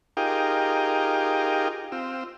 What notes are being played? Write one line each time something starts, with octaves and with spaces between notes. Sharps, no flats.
D#4 F4 G4 G#4 A#4 G5
C4 F4 E6